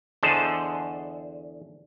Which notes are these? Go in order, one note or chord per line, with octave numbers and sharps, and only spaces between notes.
E2 D3 G#4 C5 D#5 A5